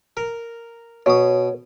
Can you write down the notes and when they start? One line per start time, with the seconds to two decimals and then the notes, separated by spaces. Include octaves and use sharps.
0.17 A#4
1.06 B2 C#5 D#6